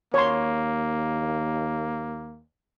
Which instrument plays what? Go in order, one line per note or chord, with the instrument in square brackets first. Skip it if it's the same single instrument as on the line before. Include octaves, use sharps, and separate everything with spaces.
[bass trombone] D#2 [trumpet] A#3 [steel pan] C#5 C6